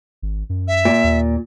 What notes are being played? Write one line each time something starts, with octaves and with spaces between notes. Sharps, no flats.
G#1
F#2
E5
A#2
D#2